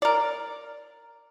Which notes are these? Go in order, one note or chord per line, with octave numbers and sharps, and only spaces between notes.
A#4 D5